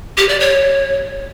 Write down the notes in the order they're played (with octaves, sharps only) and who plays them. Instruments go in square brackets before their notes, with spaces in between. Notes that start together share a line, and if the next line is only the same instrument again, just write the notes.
[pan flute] G4
D5
C#5